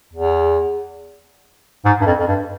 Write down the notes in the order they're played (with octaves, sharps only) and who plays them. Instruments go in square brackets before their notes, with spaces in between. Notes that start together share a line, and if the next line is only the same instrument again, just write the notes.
[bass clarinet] E2
G#2
G2
F2
F2
G2